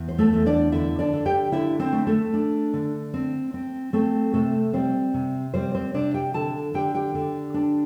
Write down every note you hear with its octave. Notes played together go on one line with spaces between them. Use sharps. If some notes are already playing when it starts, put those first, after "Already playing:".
Already playing: E2
C5
A3 A4
E2
D4 D5
D3 E4 E5
D4 D5
D3
G4 G5
D3 E4 E5
C4 C5
A3
A3 A4
D4
D3
C4
C4
A3 C4 A4
C3 A3 A4
G3 C4 C5
C3
G3 C4 C5
C4 C5
C3 D4 D5
G4 G5
D3 A4 A5
D3 G4 G5
G4 G5
D3
D4